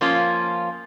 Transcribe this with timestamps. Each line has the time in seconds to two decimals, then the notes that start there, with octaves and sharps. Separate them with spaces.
0.01 F3 A#3 C#4 F4